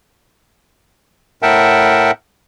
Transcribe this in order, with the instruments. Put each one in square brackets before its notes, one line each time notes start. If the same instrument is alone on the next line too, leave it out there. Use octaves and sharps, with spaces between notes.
[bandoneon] A2 A#4 E5 F#5 G5 A5